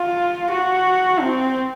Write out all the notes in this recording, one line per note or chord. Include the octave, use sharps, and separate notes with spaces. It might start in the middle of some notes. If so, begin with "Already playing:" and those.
Already playing: F4
F#4
C4